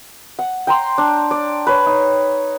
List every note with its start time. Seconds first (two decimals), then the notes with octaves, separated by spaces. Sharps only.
0.39 F#5
0.67 G5 A#5 C6
0.98 D4
1.31 D5
1.67 B4 C#5
1.86 D#4